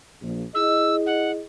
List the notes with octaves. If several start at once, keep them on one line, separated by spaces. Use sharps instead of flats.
A#1
E4 G#4 D#5 E6
F#5